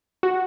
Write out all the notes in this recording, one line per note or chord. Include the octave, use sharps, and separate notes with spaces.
F#4